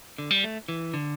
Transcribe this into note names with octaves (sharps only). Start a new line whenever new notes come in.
D3
G3
A3
E3
D3